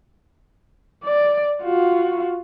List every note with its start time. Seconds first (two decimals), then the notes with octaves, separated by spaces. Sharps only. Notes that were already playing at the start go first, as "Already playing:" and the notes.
1.04 D5
1.64 F4 F#4